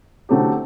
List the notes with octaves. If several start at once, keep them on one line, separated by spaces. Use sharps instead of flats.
D3 F#3 A3 C4 G4